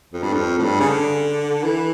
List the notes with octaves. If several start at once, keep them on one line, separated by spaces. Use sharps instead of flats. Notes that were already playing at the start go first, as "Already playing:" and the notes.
F2
G2
F2
A2
G2
C#3
D3
E3